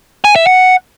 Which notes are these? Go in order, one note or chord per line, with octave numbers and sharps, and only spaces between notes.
G#5
E5
F#5